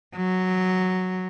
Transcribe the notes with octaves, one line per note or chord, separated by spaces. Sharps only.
F#3